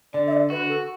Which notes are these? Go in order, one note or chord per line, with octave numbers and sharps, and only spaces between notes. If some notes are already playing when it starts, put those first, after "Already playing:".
D3 D5
E5
D5
F#4 B4
A4